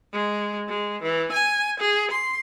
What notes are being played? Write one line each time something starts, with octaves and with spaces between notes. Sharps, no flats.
G#3
G#3
E3
G#5
G#4
C6